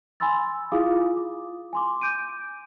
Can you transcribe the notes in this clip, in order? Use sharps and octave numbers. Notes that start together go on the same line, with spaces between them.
G#5 B5 C6 E6 A6
E4 F4 G#4 F5 D6 D#6
D6
G#5 C6 D6
D6 G6 D7 D#7